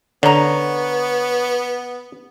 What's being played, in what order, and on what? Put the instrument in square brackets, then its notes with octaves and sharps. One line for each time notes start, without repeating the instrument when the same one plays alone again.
[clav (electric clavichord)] D3 [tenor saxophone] B3 [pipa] C#4 A#5